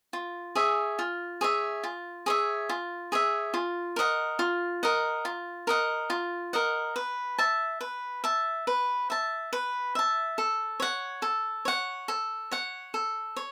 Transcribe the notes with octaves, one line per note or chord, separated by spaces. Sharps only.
F4
G#4 C#5 E5
F4
G#4 C#5 E5
F4
G#4 C#5 E5
F4
G#4 C#5 E5
F4
A#4 D#5 F#5
F4
A#4 D#5 F#5
F4
A#4 D#5 F#5
F4
A#4 D#5 F#5
B4
E5 A5
B4
E5 A5
B4
E5 A5
B4
E5 A5
A4
C#5 F#5
A4
C#5 F#5
A4
C#5 F#5
A4
C#5